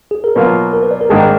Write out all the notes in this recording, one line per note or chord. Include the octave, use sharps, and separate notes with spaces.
G#4
A#4
B2 F#3 A#3 F4 B4
A#4
B4
D5
A#4
G#1 G#2 D#3 A#3 D4 G#4